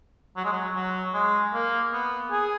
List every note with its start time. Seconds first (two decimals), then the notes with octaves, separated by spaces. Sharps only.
0.37 F#3
0.45 G#3
0.53 F#3
0.76 F#3
1.14 G#3
1.54 A#3
1.93 B3
2.31 G#4